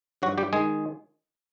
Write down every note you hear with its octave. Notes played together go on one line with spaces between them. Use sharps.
G2 F#3 F#4
G3 G4
D#3 G#3 G#4